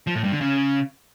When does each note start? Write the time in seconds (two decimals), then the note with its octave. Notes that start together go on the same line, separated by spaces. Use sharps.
0.07 F3
0.15 A2
0.24 G2
0.32 D3
0.41 C#3